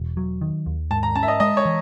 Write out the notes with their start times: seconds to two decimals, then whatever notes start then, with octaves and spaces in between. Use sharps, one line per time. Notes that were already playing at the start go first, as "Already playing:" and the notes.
Already playing: E1
0.17 F#3
0.41 D#3
0.66 D#2
0.91 G#2 A5
1.03 A#5
1.15 C#4 A5
1.23 E5
1.28 D#5
1.40 G#3 D#5
1.57 C#5
1.65 E3